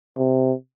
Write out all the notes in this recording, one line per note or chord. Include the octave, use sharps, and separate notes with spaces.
C3